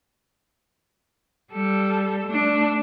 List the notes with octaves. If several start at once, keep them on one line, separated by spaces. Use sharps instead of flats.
G3 A4
A3 D4